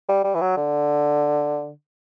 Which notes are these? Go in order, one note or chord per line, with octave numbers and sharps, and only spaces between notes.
G3
G3
E3
F#3
D3